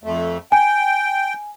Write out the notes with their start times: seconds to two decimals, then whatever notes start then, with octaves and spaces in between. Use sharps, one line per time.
0.04 F2 A3
0.52 G5 G#5